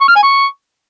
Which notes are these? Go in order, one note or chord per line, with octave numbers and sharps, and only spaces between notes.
C#6
F6
G#5
C#6